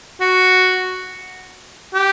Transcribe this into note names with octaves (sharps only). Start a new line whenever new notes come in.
F#4
G4